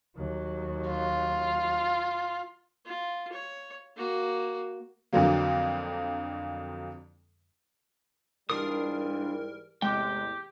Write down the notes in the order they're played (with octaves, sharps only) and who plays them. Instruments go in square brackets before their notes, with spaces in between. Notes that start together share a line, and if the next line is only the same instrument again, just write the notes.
[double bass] D#2 F#3
[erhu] F4
[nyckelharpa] F4
C#5
A#3 F#4
[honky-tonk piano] F2 D3 F3 F#3 A#3
[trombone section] G#2 E3 G3 [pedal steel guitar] D4 F4 D#6 [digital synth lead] A#4
[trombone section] E2 A2 C3 [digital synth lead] G#3 [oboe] G4 [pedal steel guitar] G5 D6